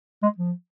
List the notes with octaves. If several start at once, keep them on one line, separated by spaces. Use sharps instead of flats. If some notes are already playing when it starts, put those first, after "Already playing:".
G#3
F3